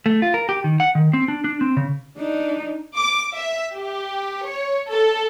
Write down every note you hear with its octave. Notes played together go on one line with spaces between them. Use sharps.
A3
F4
A#4
G4
D#3
F#5
D#3
C4
D4
D4
C4
C#3
D4 D#4
D6
E5
G4
C#5
A4